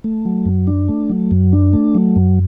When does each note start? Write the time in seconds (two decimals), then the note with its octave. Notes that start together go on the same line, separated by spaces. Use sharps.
0.04 A3
0.25 F#3
0.46 F#2
0.67 D4
0.88 A3
1.10 F#3
1.31 F#2
1.53 D4
1.73 A3
1.95 F#3
2.16 F#2